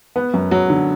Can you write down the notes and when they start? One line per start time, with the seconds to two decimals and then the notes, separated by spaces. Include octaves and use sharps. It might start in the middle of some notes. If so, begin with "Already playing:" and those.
0.16 B3
0.34 F#2
0.51 F#3
0.70 D3